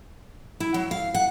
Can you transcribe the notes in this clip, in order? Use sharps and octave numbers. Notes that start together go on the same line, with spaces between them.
E4
F#3
F5
F#5